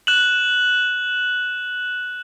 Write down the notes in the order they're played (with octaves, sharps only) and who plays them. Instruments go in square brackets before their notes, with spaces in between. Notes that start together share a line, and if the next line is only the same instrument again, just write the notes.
[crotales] F#6 E7 F#7